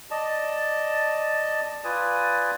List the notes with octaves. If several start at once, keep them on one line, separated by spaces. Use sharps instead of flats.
D5 D#5 A5
F4 B4 D5 G#5 D#6